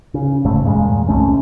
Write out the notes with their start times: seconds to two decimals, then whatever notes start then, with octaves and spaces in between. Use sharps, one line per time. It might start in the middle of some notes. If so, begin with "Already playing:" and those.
0.14 C#3
0.45 F1 G#2 C#3 A3
0.63 E2 G2 A#2 G#3
1.09 C2 C3 A3 C#4